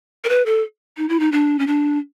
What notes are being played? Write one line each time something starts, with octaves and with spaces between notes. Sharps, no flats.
A#4
B4
A4
D#4
E4
D#4
D4
C#4
D4